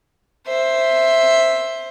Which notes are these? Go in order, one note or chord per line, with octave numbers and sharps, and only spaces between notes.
C5 E5